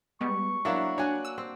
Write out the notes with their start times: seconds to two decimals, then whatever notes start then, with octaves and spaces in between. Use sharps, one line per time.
0.21 G3 G#3 B3 C#6
0.65 F#3 A#3 D4 E4
0.98 D4 F#4 C#5 G#5
1.25 E6
1.38 C4